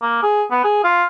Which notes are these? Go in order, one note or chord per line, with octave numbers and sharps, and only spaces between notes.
A#3
G#4
B3
G#4
F4